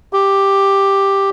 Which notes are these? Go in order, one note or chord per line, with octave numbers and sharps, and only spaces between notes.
G4